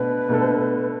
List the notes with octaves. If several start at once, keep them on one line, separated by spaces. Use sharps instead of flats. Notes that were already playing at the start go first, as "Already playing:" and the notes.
Already playing: B2 A3 D4 B4
B2 A3 D4 A4